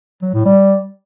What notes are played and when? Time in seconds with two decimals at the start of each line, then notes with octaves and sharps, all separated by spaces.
0.22 F#3
0.34 A2
0.45 G3